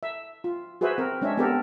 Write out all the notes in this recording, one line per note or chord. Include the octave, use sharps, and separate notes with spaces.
E5
F4
F#4 G#4 B4 C5 E5
C4 A#4
G#3 C#4 D4 C#5 E5
B3 C4 G4 A4 A#4